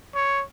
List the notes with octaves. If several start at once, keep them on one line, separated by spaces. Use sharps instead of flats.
C#5